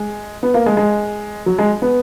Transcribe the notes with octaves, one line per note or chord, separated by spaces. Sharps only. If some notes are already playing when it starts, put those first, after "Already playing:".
Already playing: G#3
B3
A#3
G#3
G#3
F#3
G#3
B3